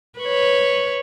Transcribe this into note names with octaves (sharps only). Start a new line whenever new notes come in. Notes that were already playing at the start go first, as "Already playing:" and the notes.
B4 C#5